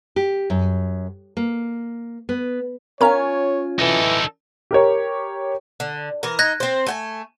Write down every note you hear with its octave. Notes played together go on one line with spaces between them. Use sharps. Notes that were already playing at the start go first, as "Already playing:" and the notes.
G4
F#2
A#3
B3
C#4 F4 A#4 C#5 G#5 A#5
E3 D#4 A4
G4 A#4 C#5
D3
E3 A#4
D#4 F#6 G#6 A#6
C4 C5
A3 G5 G#5